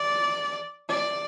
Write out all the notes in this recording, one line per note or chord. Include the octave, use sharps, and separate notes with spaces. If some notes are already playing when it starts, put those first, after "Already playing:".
Already playing: D5
D5